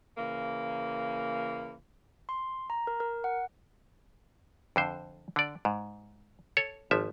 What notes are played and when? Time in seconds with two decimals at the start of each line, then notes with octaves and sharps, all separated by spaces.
0.18 C#3 E3 A#3
2.29 C6
2.70 A#5
2.87 A#4
3.00 A#4
3.24 F#5
4.76 F2 D3 C5
5.36 D3 D5
5.65 G#2
6.57 A4 C#5
6.91 G#1 F3 E5